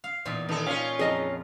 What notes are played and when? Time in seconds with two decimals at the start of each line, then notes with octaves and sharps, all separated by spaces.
0.04 F5
0.25 E2 A#2 D#4
0.49 D#3 D#4 A4
0.66 C#4 F4 F5
0.99 F2 G#4 D#5 A#5